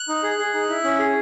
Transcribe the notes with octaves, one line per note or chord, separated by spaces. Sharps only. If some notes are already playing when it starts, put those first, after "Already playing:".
Already playing: F#6
D#4
G#4
G#4
D#4
E4
C#4
G#4